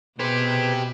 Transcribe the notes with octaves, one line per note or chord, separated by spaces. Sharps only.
B2 G4 G#4 B4 C5